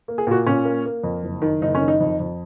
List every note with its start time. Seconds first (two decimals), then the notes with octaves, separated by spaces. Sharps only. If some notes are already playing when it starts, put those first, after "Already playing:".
0.08 A#3
0.18 G#4
0.27 A#2 F#4
0.47 A#2 C#4
0.65 A#3
0.85 A#3
1.03 F2
1.23 F#1
1.42 D#3
1.61 F#1 D#4
1.75 C#4
1.81 D#3
1.88 D#4
2.00 F2
2.20 F2